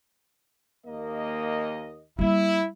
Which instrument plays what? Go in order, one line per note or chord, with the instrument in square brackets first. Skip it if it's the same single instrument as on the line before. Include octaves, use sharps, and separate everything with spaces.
[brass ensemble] D#2 A#3 D#5
[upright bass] G3 A#3 [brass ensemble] E4